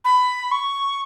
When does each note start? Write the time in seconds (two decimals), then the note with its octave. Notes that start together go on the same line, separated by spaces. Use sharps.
0.05 B5
0.52 C#6